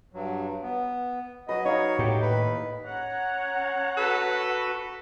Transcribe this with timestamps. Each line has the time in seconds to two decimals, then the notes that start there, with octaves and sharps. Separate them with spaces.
0.14 G2 F#3
0.63 B3
1.49 F#3 F#4 B4 D#5
1.65 D#4 C#5 F5
1.99 A2 G4
2.22 D#2 B4
2.85 C#4 C#5 F#5 A#5
3.97 F#4 A4 B4